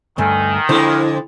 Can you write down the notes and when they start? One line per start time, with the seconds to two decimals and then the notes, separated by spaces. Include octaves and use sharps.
0.18 D2 G2 D#3 A3 G#5
0.69 F2 D3 G#3 E4 C5